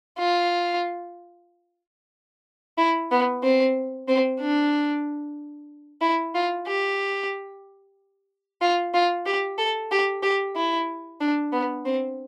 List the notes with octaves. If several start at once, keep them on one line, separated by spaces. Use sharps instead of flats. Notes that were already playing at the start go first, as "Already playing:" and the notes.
F4
E4
B3
C4
C4
D4
E4
F4
G4
F4
F4
G4
A4
G4
G4
E4
D4
B3
C4